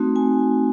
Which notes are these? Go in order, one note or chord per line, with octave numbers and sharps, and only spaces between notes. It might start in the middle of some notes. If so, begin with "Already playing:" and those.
Already playing: A3 C4 D#4 F#4
G#5